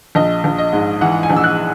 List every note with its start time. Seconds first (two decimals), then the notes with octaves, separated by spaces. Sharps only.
0.15 A#1 D#5
0.44 A#1
0.58 D#5
0.73 G#2
1.01 E3 F#5
1.23 G#5
1.30 A#1
1.36 E6
1.44 F#6